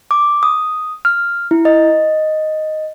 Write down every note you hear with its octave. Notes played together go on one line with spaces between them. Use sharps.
D6
D#6
F6
E4
D#5